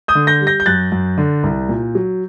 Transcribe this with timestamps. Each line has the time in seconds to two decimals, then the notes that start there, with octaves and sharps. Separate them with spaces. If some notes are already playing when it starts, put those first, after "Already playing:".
0.08 D#6 G6
0.15 D3
0.27 G6 A#6
0.41 G3
0.47 G6 A#6
0.60 G6
0.66 F#2 F#6 A6
0.92 F#2
1.18 D3
1.44 C2
1.69 A#2
1.95 F#3